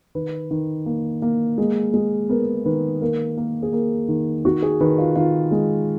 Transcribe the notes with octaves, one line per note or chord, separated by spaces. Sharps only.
D#3 B4
D#3
A#3
A#3
G#3
G#3
B3 A#4
D#3 B4
A#3 A#4
A#3
G#4
A#3 A#4
D#3
D#3 F#4
G#4
D#3 B4
F4
D#3 F4
G#3